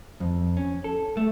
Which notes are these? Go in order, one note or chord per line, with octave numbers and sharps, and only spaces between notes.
F2
C#4
A4
A3